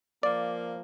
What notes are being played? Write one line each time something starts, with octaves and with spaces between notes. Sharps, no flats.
F3 A#3 D5